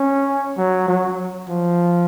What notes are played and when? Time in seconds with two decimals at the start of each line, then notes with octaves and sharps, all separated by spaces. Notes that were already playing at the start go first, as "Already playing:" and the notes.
Already playing: C#4
0.57 F#3
0.88 F#3
1.49 F3